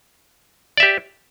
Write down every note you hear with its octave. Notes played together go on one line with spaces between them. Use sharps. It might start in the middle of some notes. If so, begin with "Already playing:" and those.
G4 D5 E5